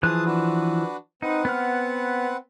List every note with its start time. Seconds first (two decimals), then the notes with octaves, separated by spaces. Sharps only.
0.03 E3 F3 G#4 A5 D#6 F#6
0.25 D4 F#4 B4
1.22 C4 D#4 B4 F#5
1.45 B3 F6